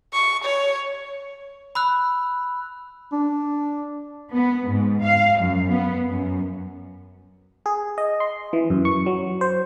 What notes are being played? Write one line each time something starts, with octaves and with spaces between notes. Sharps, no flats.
C#6
C#5
B5 E6 F#6
D4
B3
G#2
F5
F#2
B3
F#2
G#4
D#5
C6
E3
F#2
C#6
F#3
C5